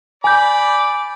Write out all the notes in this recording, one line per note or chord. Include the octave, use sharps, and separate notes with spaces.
D5 G#5 B5 D6 G6